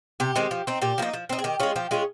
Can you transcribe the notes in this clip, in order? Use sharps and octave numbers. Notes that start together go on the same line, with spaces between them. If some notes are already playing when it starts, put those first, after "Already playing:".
C3 G4
D#3 G#3 C4
F3
C4 D#4
A#2 G4
F3 A#3 D#4
F3
C4 D#4
G#4
D#3 G4
G#3 C#4 F4 G#4
F3 G4
G#3 C#4 F4 G#4